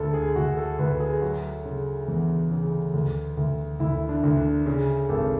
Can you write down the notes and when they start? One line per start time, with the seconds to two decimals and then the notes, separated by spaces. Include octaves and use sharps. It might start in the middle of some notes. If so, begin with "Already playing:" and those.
Already playing: D2 D3 A4
0.14 G#4
0.36 D2 F#4
0.57 A4
0.79 D2 B4
1.00 G#4
1.22 F#3 F#4
1.65 C#3
2.08 E2
2.51 C#3
2.94 D2
3.37 D2
3.80 D2 E4
4.09 D4
4.24 D2
4.37 D4
4.66 C#3
5.09 G#1 A4